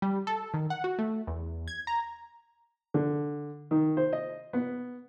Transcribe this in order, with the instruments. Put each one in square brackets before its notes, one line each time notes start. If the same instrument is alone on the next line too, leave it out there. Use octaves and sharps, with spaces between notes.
[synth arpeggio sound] G3
A4
D#3
F#5
F#4
A3
E2
G#6
A#5
[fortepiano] D3
D#3
C5
D#5
B3